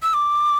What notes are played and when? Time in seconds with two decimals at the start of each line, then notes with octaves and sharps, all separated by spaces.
0.02 E6
0.14 D6